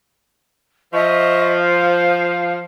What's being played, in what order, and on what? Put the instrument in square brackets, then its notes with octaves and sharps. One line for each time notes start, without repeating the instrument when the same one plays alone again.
[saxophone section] F3 [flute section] D#5 E5 C#6
[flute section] F5